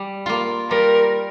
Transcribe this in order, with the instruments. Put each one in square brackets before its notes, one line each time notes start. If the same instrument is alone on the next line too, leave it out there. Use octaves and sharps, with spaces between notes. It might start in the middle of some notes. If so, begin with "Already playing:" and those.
Already playing: [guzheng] G3
A#3 F4
[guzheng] G3 [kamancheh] A#4